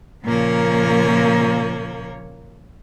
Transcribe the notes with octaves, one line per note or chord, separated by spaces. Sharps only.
A#2 C#3 F3 A#3 A#4 C#5